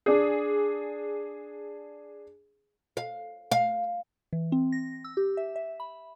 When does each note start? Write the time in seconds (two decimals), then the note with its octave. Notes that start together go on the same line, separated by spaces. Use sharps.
0.06 D4 G#4
2.97 F5
3.52 F5
4.33 E3
4.52 C4
4.72 A#6
5.04 E6
5.17 G4
5.37 E5
5.56 E5
5.80 B5